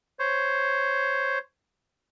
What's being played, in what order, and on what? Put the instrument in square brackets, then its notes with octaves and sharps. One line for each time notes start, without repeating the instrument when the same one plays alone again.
[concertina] C5 C#5